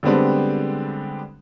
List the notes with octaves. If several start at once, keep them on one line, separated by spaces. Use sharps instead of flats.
D3 G3 G#3 B3 C4 D4